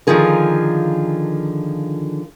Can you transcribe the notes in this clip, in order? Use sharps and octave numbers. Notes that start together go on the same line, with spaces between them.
D3 D#3 F3 F4 G#4 A#4